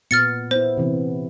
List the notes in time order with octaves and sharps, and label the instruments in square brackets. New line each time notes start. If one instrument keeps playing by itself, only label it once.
[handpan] A#2 B3 [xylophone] F6 A6 C#7
[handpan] B3 E4 [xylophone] C5
[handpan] C3 E3 B3